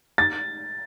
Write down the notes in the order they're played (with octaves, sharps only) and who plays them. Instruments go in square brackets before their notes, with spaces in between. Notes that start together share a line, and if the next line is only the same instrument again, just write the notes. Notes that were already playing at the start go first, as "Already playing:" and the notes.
[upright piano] A6